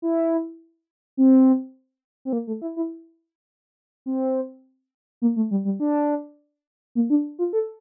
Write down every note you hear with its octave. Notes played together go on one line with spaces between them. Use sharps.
E4
C4
C4
A#3
A3
E4
E4
C4
A#3
A3
G3
G3
D4
A#3
D4
F4
A4